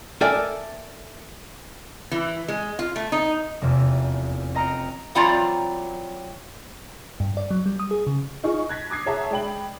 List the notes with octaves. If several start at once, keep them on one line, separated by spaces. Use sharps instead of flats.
A4 A#4 D5 E5 G5 G#5
E3
G#3
F4
A3
D#4
F1 E2 C3 A#3
C4 D#5 A#5 F6 C#7 D7
E3 F#3 C4 F4 D5 A#5
G2
D5
F#3
G3
D#6
G#4
C#3
D#4 F4 G#4 C#6
F#6 G#6 A#6 B6
D6 D#6 G#6 C7
G#4 C#5 E5 F#5 A5 A#5
G#3 D5 G5 B5 F#7